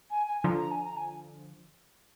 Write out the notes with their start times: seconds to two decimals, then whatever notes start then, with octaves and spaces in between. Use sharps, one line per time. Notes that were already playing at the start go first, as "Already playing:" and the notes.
0.10 G#5
0.27 G#5
0.41 G#5
0.44 D3 F3 A#5
0.58 A#5
0.71 G#5
0.84 A#5
0.97 G#5